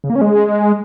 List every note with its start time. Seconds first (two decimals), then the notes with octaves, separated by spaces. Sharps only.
0.04 C#3
0.10 A#3
0.16 C#4
0.21 G#3